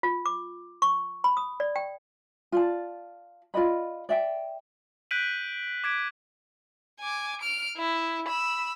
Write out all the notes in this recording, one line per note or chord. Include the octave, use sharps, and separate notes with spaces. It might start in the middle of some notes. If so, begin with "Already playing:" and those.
F4
D6
C#6
B5
D#6
D5
G5
F4 D5 A5
F4 D5 D#5 B5
D5 E5 G5
F#6 G6 B6 D7 D#7 F#7
D6 G#6 B6 D7
G#5 D6
F6 D7
E4
B5 E6